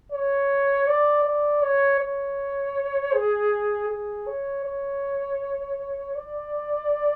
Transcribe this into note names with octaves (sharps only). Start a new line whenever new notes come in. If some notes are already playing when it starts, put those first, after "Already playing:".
C#5
D5
D5
C#5
C#5
G#4
G#4
C#5
C#5
D5